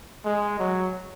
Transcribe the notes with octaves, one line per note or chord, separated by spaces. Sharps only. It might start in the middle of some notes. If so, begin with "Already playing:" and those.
G#3
F#3